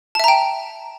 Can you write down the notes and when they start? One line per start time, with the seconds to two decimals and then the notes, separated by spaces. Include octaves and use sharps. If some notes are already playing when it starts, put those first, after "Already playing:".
0.15 A5
0.20 E5
0.24 A#5
0.28 G5